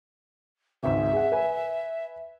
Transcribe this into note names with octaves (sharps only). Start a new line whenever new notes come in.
G#1 C#2 G#2 E5
G#4 F#5
B4 G#5